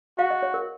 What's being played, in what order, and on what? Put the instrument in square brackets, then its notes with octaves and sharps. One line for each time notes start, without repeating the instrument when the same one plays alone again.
[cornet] F#4 [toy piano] F5
[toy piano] D#5
C#5
A#4